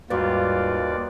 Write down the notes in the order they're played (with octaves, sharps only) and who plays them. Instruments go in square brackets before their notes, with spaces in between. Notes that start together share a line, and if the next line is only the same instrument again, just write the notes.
[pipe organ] D#2 D5 [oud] G#2 G3 [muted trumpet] F4 [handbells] F#4 B4